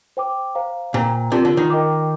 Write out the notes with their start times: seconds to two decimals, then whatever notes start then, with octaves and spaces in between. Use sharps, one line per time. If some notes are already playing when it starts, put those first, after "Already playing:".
0.17 C5 G5 D6
0.55 C5 F5 A#5
0.94 A#2 C5 G5 A#5
1.32 C3 D4 F4 A#4 D5 A5
1.45 D3
1.57 D#3
1.70 A#4 D#5 G5 A#5 D6